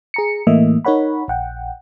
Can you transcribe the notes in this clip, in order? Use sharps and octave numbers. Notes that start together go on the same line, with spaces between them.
G#4 A#5 C#7
A2 E3 A3 A#3 D#5 E5
D#4 A#4 C#5 F#5 B5
A#1 F#5 G5